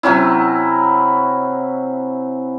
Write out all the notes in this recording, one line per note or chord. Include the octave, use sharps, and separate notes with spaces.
C3 F#3 C#4 E4